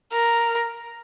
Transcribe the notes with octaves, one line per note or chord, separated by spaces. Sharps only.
A#4